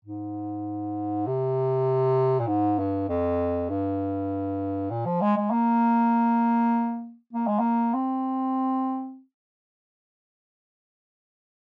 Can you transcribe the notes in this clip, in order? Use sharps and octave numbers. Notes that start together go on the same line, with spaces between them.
G#2
C3
A#2
G#2
G2
F2
G2
A#2
F3
G#3
G#3
A#3
A#3
G#3
A#3
C4